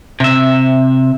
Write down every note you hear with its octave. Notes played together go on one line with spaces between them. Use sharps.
C3 E5